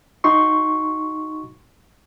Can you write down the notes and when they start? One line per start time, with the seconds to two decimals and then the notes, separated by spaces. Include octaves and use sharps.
0.24 D#4 F#4 C6 C#6